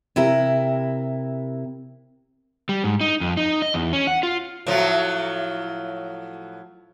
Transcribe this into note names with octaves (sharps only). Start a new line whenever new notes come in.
C3 E4 A#4
G3
G#2
D#4
F2
D#4
D#5
E2
C#4
F#5
F4
A2 F3 F#3